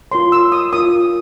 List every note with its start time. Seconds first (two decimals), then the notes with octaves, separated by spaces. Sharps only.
0.12 F4 A#4 C#5 C6
0.32 E6
0.52 D#6
0.73 F4 A#4 C#5 D#6